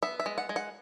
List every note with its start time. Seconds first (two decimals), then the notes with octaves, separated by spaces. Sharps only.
0.03 B3 E5
0.20 E5
0.26 G#3
0.38 F#5
0.49 G#3
0.56 F#5